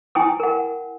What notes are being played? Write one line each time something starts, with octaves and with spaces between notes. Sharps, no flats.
E4 G5 G#5 D#6
A#4 F#5